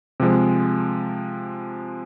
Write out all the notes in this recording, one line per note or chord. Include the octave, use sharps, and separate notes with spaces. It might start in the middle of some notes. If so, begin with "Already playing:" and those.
C3 F3 G#3